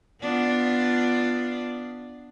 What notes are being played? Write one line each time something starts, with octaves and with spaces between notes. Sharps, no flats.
B3 D4 F4